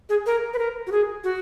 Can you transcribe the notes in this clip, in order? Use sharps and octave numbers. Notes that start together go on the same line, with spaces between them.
G#4
A#4
B4
A#4
F#4
G#4
F#4